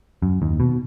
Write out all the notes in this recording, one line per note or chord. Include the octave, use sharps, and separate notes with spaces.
F#2
D#2
B2